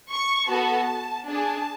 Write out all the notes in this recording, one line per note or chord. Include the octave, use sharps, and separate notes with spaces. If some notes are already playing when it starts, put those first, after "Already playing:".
C#6
B3 F#4 A4 A5
D4 G#4 A5